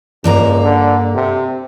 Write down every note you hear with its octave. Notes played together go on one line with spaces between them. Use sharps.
C#2 G2 A#3 A#5
D3
C3